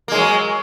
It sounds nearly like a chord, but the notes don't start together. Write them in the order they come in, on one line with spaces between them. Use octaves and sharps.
A#3 G#3 F#3